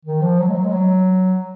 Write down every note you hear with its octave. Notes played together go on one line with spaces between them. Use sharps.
D#3
F3
F#3
G#3
F#3
G#3
F#3